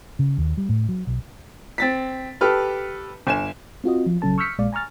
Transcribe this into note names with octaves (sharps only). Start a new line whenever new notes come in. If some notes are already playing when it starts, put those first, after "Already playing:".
C#3
D#2
G3
A2
F#3
B1
C4 A6 B6
G4 A4 B4 F6
G1 G#5 E7
C4 F4 F#4 D#5
F3 F4
A#1 C#3 F#3 C#4 A4 A5
C#6 E6 F6 G6 B6 C#7
A#1 A#2 G#3 D5 F5
G#5 A#5 C#6 F6 A6